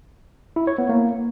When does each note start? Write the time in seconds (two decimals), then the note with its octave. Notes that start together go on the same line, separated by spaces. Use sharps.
0.56 E4
0.67 C#5
0.78 B3
0.89 A#3